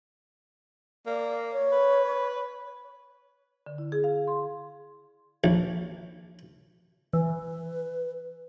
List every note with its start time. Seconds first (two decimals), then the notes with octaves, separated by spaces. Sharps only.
1.06 A#3 D5
1.52 C#5
1.72 B4
3.66 D3
3.78 E4
3.92 G#4
4.04 F5
4.28 C6
5.44 A#1
7.13 E3 B4